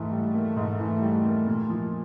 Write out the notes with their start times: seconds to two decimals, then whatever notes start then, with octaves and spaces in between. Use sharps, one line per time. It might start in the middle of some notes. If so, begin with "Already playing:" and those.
Already playing: G#2 E3 A3
0.12 G3
0.34 A#3
0.56 G#2
0.79 E3
1.02 G3
1.24 A#3
1.48 A#2
1.70 F3